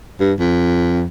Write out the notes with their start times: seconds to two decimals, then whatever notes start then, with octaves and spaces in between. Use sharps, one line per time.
0.20 G2
0.39 F2